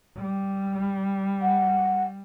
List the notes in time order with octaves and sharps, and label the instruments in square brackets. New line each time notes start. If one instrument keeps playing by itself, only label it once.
[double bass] G3
[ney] F#5